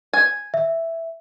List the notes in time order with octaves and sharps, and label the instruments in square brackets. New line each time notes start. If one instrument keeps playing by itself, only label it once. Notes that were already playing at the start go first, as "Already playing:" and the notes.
[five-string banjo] G#5
[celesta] E5